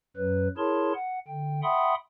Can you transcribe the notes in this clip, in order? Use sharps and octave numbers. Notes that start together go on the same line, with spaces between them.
F#2 F#3 B4
E4 G#4 A#4 C#5 A5 C6
F#5
D3 G5
E5 F#5 G5 B5 C6 D#6